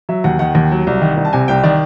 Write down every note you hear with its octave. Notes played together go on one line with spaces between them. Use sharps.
F#3 E5
D#2 F#5
D#3 F#5
D#2
F#3
C2
D#3
C2
A5
C3 G#5
C2 G5
D#3 D5